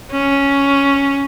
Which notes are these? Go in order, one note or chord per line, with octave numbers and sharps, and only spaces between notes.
C#4